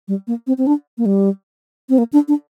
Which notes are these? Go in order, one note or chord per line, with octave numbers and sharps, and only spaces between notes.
G3
A#3
C4
C4
D4
A#3
G3
C4
A#3
D4
D4